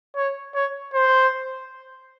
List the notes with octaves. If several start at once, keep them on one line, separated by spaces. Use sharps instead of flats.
C#5
C#5
C5